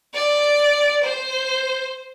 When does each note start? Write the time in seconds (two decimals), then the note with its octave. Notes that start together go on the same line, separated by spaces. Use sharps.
0.14 D5
1.04 C5